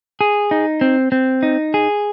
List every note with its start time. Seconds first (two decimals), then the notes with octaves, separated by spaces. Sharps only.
0.21 G#4
0.51 D#4
0.81 C4
1.12 C4
1.43 D#4
1.74 G#4